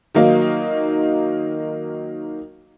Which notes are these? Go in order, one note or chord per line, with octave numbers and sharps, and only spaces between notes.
D#3 F#3 A#3 D#4